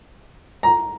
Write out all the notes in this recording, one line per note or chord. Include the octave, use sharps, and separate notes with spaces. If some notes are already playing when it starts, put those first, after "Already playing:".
A#5